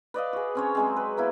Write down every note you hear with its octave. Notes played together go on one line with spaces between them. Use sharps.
B4 D5 D#5 F5
F#4 G#4
C4 C#4 C#5
F#3 G#3 C4
B4
A#3 B3 E4